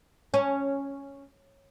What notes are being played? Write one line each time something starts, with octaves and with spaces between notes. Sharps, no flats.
C#4